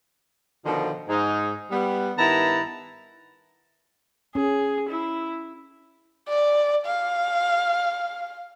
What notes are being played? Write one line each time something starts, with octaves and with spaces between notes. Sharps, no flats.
B2 D3 D#3 F3
G#2 D#4
G3 B3
G2 D#3 B3 E4 A5 A#5
C#4 G#4
E4
D5
F5